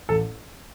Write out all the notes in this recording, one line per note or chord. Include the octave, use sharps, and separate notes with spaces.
A1 A4